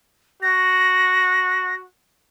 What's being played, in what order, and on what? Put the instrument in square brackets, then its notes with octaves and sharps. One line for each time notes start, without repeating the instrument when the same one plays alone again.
[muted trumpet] F#4 [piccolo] A#6